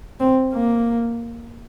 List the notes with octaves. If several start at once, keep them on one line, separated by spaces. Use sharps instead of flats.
C4
A#3